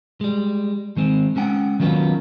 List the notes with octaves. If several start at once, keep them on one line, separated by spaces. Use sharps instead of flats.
G3 G#3
D#3 G#3 C4
G#3 C#4 F#5 G5
D#3 F#3 A#3 B3 C#4 F4